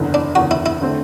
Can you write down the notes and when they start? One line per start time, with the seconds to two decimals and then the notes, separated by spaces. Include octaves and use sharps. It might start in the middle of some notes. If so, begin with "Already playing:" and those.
Already playing: F#1 E2 D3
0.14 D4
0.35 F#1 E2 D3 F#4
0.51 E4
0.66 E4
0.82 D3 A3 C4